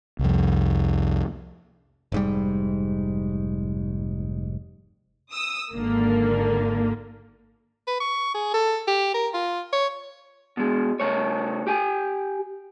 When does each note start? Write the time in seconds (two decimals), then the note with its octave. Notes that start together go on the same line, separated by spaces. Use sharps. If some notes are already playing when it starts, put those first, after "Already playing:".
0.19 C2 F2
2.12 F1 G#2 G3
5.32 D#6 E6
5.73 G#1 D3 A#3
7.87 B4
8.00 C#6
8.35 G#4
8.54 A4
8.87 G4
9.14 A#4
9.34 F4
9.73 C#5
10.57 B2 G#3
11.00 C#3 A3 C#5
11.67 G4 G5 G#5